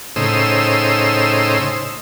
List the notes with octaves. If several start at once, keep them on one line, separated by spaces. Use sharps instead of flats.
A2 C#3 D#4 C5 E6